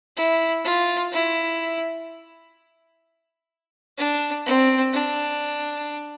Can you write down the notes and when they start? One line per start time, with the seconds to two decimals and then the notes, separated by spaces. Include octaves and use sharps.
0.16 E4
0.64 F4
1.12 E4
3.98 D4
4.46 C4
4.93 D4